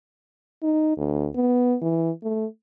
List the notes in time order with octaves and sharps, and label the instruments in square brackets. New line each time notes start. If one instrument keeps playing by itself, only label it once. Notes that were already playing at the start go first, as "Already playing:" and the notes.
[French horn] D#4
D2
B3
E3
A3